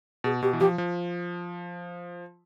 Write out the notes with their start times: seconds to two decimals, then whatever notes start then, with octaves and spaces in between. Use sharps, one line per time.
0.24 B2 G#4
0.43 B2 G4
0.53 E3
0.60 F3 G4
0.78 F3